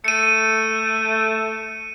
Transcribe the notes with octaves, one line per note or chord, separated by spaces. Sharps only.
A3 C#7 D#7